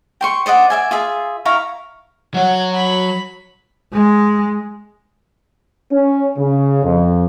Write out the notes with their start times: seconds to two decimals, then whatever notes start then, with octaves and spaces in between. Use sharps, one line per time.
0.21 G5 C6 C#6
0.46 C5 D5 D#5 F#5
0.70 D5 E5 G#5
0.91 F4 G#4 E5
1.45 E4 F5 A#5 C#6
2.34 F#3 C#5 F#5
2.74 B5
3.93 G#3
5.91 C#4
6.37 C#3
6.84 F2